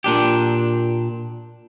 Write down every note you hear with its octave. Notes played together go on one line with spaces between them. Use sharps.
A#2 D4 G4